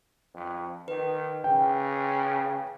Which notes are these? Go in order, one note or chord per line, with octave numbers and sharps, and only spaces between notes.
F2
D#3 B4
C#3 G5